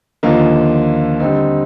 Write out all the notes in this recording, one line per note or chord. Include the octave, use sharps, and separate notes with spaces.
D#2 D3 F3 A#3 D#4
D3 G3 C4 D#4